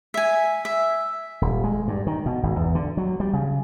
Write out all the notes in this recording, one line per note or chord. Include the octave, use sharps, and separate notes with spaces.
E5 G#5
E5
D#1
G#3
G2
D#3
B2
G#1
E2
D3
F#3
G3
C#3